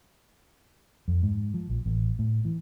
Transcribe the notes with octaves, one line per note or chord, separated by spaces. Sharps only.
F2
G#2
F3
A#1
A1
A2
E3